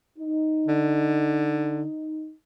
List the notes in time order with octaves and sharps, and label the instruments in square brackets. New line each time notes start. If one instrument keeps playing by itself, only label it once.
[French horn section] D#4
[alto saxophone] D3